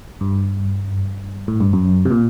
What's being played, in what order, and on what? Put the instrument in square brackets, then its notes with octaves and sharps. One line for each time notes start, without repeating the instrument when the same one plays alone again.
[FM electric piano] G2
A2
G2
F#2
C3
A#2